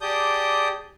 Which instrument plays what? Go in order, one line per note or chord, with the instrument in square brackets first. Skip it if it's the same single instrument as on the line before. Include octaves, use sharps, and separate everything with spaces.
[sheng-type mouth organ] G4 G#4 D5 A5 D#6 G6